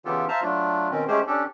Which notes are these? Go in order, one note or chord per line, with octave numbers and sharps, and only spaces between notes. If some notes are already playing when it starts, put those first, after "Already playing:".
C#3 E3 B3 F4 G4 A4
C5 E5 F5 A5 A#5
F#3 A3 D4 F4
B2 D#3 C4 C#4
G#3 A3 C#4 G4 G#4 C5
C#4 D4 G4 A4